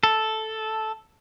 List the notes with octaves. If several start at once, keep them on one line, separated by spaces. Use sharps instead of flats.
A4